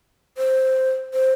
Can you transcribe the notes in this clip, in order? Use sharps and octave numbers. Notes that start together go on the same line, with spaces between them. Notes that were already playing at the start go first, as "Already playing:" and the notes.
C5
C5